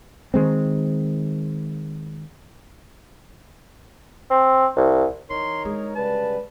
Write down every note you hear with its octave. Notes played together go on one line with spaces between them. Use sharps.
D#3 G#3 C4
C4
C2
E3 D#4 A#4 C#5 C6
D3 G#3 G#4
C#3 G3 B4 A5